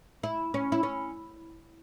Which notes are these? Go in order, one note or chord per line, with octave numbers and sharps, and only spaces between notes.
E4
C#4
E4
C#4